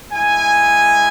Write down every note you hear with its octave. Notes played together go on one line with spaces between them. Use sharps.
G#3 E4 G#5